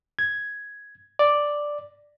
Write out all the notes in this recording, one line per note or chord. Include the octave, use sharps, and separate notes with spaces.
G#6
D5